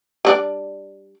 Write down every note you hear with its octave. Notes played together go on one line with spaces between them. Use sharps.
G3 D4 D5